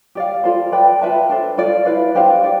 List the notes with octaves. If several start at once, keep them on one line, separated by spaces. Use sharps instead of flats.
G4 D5 F5
F4 A4 C5
B4 D5 G5
F4 B4 E5 A5
D4 A4 C5
F4 A4 D5
E4 B4 F5
D4 G4 C5 F5
G4 D5 F5